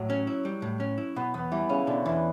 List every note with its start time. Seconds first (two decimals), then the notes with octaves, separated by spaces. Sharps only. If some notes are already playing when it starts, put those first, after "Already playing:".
Already playing: A2 F#3
0.10 C#4
0.27 E4
0.45 G3
0.62 A2
0.80 C#4
0.98 E4
1.16 B2 B3
1.34 E2 B3
1.52 E3 G3
1.69 C#3 C#4
1.87 B2 D3
2.05 E2 E3